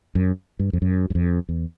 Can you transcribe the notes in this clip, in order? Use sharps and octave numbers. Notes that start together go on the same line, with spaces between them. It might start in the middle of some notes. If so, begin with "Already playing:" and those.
F#2
G2
F2
F#2
F#2
F2
E2